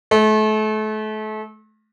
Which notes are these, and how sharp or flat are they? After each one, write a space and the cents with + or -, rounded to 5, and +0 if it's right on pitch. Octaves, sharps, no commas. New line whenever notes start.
A3 -35